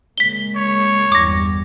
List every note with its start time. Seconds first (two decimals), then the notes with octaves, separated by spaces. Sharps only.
0.18 C#3 G#3 A#3 B6 G7
0.56 C#5
1.12 G1 E2 G3 D6 A#6